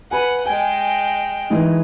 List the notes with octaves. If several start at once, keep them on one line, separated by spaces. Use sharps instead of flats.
B4 F#5 G#5
G#3 G5 G#5
E3 G#3 D#4